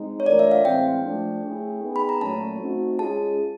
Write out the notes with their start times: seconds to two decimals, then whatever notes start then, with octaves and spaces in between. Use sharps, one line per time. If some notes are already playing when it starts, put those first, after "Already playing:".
Already playing: G#3 C4 D#4
0.20 C#5
0.26 E3 A3 D4 F4 A#4 D5
0.39 E5
0.52 F5
0.64 A2 E3 G#3 C4 G5
1.03 F3 A3 D4
1.43 A3 C#4 E4 G#4
1.82 B3 D#4 G#4
1.96 B5
2.09 A#5
2.21 A#2 F#3 A3 C#4 A5
2.60 A3 C4 D#4 F#4
2.99 G#3 C#4 F4 G#4 A5